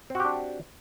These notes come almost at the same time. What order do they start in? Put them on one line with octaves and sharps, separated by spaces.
C4 F#4 G4 D4